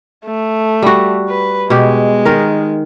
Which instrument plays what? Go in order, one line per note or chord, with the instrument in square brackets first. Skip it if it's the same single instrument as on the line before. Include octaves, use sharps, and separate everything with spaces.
[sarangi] A3
[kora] G3 F#4
[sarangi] B4
[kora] B2 G4 [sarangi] G#3
[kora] D#3 A#4